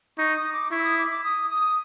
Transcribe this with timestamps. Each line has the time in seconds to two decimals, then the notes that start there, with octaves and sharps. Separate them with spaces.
0.18 D#4 C#6
0.36 D#6
0.53 D6
0.71 E4 C#6
0.79 E6
0.84 D#6
0.98 D6
1.11 D6
1.24 D#6
1.50 D#6